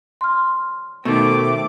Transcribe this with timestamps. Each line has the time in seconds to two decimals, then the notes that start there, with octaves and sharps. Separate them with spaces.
0.21 C6 F6
1.05 B2 D#3 A3 C4 D6